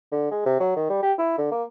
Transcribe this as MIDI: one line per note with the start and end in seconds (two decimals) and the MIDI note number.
0.12 0.28 50
0.31 0.45 56
0.46 0.57 48
0.60 0.75 54
0.76 0.89 51
0.90 1.03 55
1.03 1.12 67
1.18 1.38 64
1.38 1.50 50
1.51 1.63 58